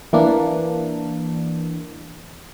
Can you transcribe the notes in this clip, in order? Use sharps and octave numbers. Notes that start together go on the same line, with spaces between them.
E3 A#3 D4